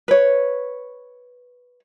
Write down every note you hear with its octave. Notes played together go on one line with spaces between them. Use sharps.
B4 C#5